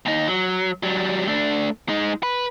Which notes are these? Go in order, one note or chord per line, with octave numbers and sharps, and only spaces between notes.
D#2 D#4
F#3
F#3 G3
A3 D4
G#3 D#4
B4